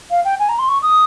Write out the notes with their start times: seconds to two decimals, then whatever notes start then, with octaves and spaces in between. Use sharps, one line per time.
0.11 F5
0.25 G5
0.39 G#5
0.49 A#5
0.59 C6
0.69 C#6
0.83 D#6